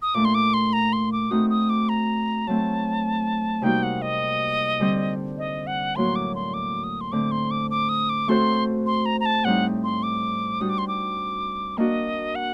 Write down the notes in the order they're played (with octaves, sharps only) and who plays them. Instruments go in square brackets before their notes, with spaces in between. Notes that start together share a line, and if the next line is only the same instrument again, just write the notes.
[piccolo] D#6
[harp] A#2 A3 D4 [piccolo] D6
[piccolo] C6
D6
C6
A#5
C6
D6
[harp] A3 C4 D#4 F#4 [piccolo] D#6
[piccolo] D#6
D6
A#5
[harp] F#3 A3 C4 [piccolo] A5
[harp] C3 G3 A#3 D#4 F#4 [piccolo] G5
[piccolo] F#5
D#5
[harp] D3 G3 C4
[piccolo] D#5
F#5
[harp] A2 F#3 A#3 F#4 [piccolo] C6
[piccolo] D6
C6
D6
D#6
C6
[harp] D3 A3 C4 [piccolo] D6
[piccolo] C6
D6
D6
D#6
D6
[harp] A3 C4 F#4 A4 C5 [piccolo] C6
[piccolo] C6
A#5
A#5
A5
[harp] A2 G3 C4 D#4 [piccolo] F#5
[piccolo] C6
D6
[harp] G3 D4 F#4 [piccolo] D#6
[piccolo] D6
C6
D6
[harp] A#3 D4 F#4 [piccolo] D#5
[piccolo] F#5